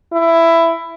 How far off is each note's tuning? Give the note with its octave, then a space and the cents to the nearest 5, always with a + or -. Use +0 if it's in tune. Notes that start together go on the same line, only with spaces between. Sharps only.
E4 +10